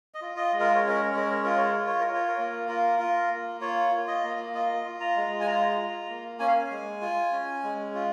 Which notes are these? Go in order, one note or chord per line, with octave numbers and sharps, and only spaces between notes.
D#5
F4
D#5
G#3
A#4
C#5
C#4
A#4
C#5
G#3 A#4
C#5
F4 A#4
C#5
F4 A#4
C#5
A#4
F4
C#5
A#4
A#3
F4 A#4
F4
A#3
F4 C#5
F4
D#5
A#3
F4 D#5
F4
A#5
G#3
G#5
F4 A#5
F4
A#3
C#4 G#5
F5
G#5
G#3
F4
C#4
G#3
F4